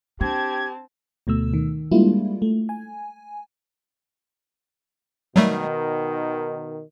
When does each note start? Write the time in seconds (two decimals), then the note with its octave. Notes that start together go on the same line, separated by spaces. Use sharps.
0.21 C4 D4 G4 A5 G#6
1.27 D2 B2 A3 E6
1.54 D#3
1.91 G3 G#3 A#3 D4 E4 F4
2.42 A3
2.69 G#5
5.36 B2 D#3 F#3 G3 A3